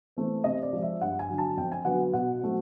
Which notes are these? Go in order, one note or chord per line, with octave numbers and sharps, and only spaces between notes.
E3 A3 C4
C3 D#5
D5
F3 G#3
E5
G2 F#5
G#5
D3 F#3
A5
F2 G5
G#5
D3 F#3 B3 F#5
B2 F#5
F#3 A3 C4